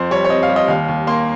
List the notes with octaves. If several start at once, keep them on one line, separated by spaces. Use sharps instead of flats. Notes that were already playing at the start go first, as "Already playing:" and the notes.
Already playing: F2 C5
G3 C#5
C#5
C4 D#5
F5
G3
D#5
D#2 F5
D#2
A#3 C6